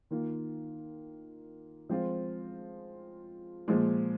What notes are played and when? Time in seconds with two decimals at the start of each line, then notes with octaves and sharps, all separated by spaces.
0.11 D#3 A#3 F4
1.89 F3 G#3 C4 F4
3.68 A#2 F3 G#3